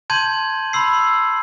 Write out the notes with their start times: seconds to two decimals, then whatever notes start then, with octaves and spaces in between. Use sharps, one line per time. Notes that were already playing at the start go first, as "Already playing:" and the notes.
0.10 A5 C6 G6 G#6 D#7 F#7
0.73 B5 C6 E6 C7